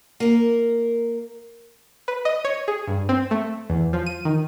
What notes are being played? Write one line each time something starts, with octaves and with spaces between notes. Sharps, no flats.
A#3 A#4
B4
D#5
C#5
G#4
G2
C4
A3
E2
F3
D#7
D#3